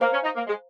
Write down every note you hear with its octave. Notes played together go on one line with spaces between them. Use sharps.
A#3 C5 F5 A#5 F6
C#4
D#4
A#3
G#3